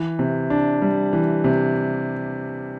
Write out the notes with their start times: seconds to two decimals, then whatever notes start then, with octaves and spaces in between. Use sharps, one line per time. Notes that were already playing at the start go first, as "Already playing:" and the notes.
Already playing: E3
0.19 C3
0.50 D4
0.82 G3
1.13 E3
1.44 C3